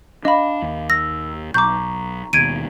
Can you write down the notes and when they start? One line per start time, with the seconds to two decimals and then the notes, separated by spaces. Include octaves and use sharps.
0.25 D4 D#5 F5 B5 D6
0.62 D#2
0.90 E6 A#6
1.54 B1 A#5 C#6 D6 G6
2.33 D#2 B2 G#6 D7 D#7